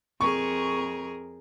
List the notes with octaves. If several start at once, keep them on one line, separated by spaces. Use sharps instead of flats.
F2 G#4 A#4 C#6